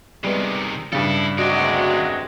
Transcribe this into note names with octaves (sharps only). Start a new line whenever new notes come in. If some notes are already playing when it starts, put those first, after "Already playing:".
C3 D#3 G3 G#3 B3
G2 C#3 E4 A4
D2 C3 F#3 G#3 F#4 D5